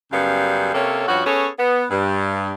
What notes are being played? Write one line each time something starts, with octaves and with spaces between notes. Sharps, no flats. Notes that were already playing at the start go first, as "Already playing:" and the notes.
F#2 C#3 G3 B3 F5
C3 A#3 C#4 A4 C#5
G2 F3 C#4 F#4
B3 C#4 G#4 A4 C#5
B3
G2